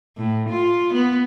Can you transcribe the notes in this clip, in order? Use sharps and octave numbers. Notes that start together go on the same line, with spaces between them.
A2
F4
B3